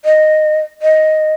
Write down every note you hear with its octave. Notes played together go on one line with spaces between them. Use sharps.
D#5
D#5